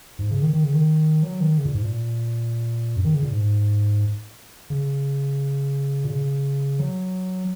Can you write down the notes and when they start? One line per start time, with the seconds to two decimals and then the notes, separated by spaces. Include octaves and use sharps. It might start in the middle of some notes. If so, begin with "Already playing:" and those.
0.19 G#2
0.31 C#3
0.42 D#3
0.53 D#3
0.64 C#3
0.73 D#3
1.23 F#3
1.40 D#3
1.58 C#3
1.65 A#2
1.74 G#2
1.82 A#2
2.96 F#2
3.05 D#3
3.14 C#3
3.23 A#2
3.32 G#2
4.70 C#3
6.04 A#2
6.09 C#3
6.79 F#3